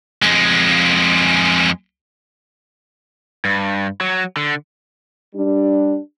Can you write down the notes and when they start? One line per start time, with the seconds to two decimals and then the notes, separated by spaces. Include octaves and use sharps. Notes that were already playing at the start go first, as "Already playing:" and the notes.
0.22 F2 G#3
3.45 G2
4.01 F#3
4.36 D3
5.35 G3 D4